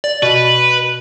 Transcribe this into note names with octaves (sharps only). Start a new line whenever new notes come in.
D5
B2 B4